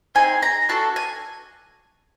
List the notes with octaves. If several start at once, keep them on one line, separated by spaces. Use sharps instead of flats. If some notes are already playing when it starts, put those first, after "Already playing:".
C4 D#4 G#4 G#5
A#5
D4 F#4 A4 A5
G#5